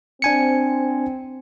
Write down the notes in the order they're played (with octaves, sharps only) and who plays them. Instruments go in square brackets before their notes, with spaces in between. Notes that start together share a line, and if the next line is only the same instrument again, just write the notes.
[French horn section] C4 [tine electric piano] D4 G#5 C#7